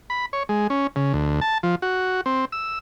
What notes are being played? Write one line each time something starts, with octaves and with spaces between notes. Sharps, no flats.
B5
C#5
G#3
C#4
C#3
D2
A5
F3
F#4
C4
E6